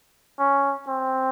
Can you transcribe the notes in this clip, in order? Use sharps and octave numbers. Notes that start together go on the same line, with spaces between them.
C#4
C4